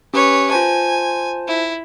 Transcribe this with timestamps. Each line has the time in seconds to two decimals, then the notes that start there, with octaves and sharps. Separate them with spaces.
0.14 C#4 G4 B4 C#5
0.51 F4 C5 G#5 A5
1.48 E4